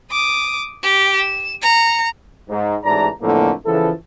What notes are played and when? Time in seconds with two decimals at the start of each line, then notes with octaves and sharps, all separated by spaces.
0.11 D6 D#6
0.83 G4
1.17 E7
1.62 A#5 C#7
2.50 G#2
2.84 A1 G#2 E3 D5 A5 A#5
3.21 F2 A2 D3 E3 A3 A#3
3.66 C#3 E3 F3 B3 E4 A4